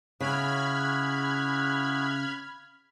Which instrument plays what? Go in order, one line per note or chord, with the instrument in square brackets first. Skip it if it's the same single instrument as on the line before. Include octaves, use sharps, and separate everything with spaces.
[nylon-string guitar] C#3 [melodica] E4 F#4 G#4 [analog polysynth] B5 F6 G#6